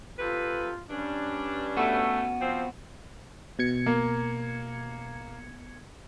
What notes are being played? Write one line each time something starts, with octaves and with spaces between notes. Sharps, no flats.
C3 F4 A4 B4
G2 C#4 D4
A3 B3 F#4
F3 C4
B2 G#6 C#7
A#3